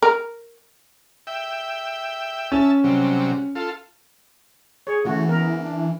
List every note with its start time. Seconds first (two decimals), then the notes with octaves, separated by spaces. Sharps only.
0.02 A#4
1.27 E5 G5
2.52 C#4 E5 A5
2.84 C3 F#3 G3
3.55 F4 A4
4.87 G#4 C#5
5.05 C#3 E3 A3 F#4
5.29 B3 A#4
5.61 D4